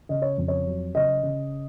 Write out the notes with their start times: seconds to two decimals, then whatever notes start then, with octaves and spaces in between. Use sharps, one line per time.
0.09 C#3 D#5
0.22 C#5
0.38 F2
0.48 C#5
0.66 F#3
0.95 C#3 D#5
1.23 C#3